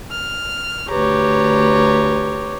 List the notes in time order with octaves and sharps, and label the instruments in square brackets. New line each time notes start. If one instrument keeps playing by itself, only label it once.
[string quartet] F6
[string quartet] D2 B4 A#5 [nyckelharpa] G4 C#5